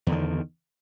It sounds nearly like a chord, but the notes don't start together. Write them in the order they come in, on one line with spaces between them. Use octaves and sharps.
E2 D3 D#3